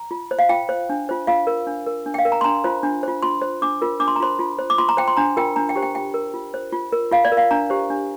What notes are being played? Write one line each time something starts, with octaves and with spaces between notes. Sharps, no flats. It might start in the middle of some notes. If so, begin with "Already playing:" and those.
Already playing: A#5
F4
C5
F5
F4 G5
C5
D4
F4 C5
F4 F5
A#4
D4
A#4
D4
G5
F5
A#4
A#5
C6
D4 A#5
F4 C5
D4
F4 C5
F4 C6
C5
D4 D6
F4 A#4
D4 D6
C6
A#5
F4 C5 C6
F4
C5
D6
F4 C6
A#5
C5 G5
C6
D4 A#5
F4 A#4 G5
D4 A#5
G5
G4 C5
G5
F4 G5
A#4
F4
C5
F4
A#4
F4 F5
D5
A#4
F5
D4 A#5
G4 C5
D4